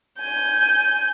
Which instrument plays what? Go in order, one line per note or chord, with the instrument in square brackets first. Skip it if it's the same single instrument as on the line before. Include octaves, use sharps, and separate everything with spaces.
[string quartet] G#5 G6